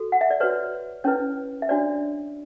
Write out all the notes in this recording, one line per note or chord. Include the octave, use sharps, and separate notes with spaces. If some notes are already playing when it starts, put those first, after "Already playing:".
Already playing: F#4 A4
F#5
E5
D5
F#4 B4 C#5
C#4 E4 B4 C#5
E5
D4 F#4 C#5 D5